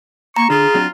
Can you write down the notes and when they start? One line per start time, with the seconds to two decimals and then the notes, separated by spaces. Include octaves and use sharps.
0.36 A#3 A#5 C#6
0.50 D3 F4 G#4
0.74 F#3 C4 D4